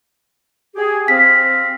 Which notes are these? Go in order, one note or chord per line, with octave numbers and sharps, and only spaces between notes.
G4 G#4
C4 F5 B6